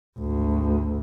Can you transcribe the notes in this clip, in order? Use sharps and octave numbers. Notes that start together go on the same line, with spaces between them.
G#1 D2